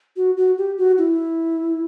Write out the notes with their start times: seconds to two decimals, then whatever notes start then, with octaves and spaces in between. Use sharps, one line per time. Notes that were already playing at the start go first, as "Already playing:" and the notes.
0.16 F#4
0.37 F#4
0.58 G4
0.78 F#4
0.98 E4